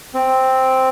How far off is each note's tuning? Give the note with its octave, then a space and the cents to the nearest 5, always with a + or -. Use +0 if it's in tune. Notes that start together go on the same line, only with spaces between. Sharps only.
C4 +0